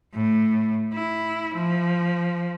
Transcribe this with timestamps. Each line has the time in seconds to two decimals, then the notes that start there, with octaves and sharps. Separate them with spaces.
0.14 A2
0.93 E4
1.53 F3